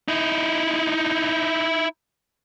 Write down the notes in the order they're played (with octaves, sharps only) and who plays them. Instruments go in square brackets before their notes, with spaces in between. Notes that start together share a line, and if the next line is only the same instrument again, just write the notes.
[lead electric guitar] D#4 E4